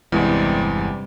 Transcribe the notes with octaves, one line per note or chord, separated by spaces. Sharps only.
G1 E2 G2 C3 G3 G#3